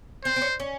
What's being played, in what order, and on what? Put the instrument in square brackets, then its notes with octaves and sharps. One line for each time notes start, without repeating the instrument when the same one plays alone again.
[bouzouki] C4 [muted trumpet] C5
[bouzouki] C4
C#4
C#4